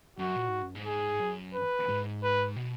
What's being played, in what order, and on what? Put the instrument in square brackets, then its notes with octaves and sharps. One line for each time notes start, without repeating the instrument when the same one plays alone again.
[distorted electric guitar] F#2 [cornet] F#4
[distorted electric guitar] A#2
G#2
F#2
G#2
[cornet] G#4
[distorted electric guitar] F#2
[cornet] B4
[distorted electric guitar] G#2
[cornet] B4
[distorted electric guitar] B2